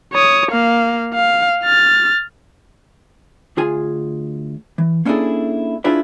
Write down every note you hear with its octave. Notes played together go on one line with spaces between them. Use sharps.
C#5 D#6
A#3 F5
F5
F6 A6
D2 F4 G#4 G#5
E3
A#3 C#4 D4 E4 G#4 A4
D4 E4 F4 G#4 B4 D5